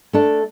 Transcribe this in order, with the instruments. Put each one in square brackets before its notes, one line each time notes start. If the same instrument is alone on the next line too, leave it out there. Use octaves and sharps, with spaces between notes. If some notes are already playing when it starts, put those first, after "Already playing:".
[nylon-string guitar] A3 D4 A4